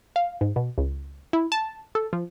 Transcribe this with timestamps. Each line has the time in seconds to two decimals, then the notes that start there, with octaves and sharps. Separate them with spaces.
0.16 F5
0.41 G#2
0.56 B2
0.78 C#2
1.33 E4
1.52 A5
1.95 A4
2.13 F3